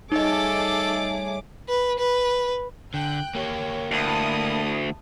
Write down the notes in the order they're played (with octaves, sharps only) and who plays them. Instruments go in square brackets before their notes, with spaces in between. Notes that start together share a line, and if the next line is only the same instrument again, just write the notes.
[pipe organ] G3 C#5 [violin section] A3 G#4 D6 [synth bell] D#4 D#5 [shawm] A4
[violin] B4
B4
[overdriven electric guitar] D3 [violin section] G5 F#6
[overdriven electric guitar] A#3 G4 [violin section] C#5
[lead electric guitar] D2 [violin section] E4 A5 D#6